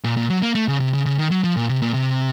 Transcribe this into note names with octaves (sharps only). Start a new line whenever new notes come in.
A#2
A#2
F#3
A#3
A3
C#3
C3
C#3
C#3
D#3
F#3
F3
A#2
C3
A#2
C3